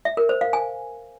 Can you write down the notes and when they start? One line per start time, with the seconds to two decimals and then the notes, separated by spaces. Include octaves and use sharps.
0.05 E5
0.17 A#4
0.29 C5
0.41 F5
0.53 G#5